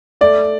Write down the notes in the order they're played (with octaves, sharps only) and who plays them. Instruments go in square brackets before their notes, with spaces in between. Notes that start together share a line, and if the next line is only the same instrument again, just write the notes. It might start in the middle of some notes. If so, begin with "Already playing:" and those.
[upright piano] A3 D5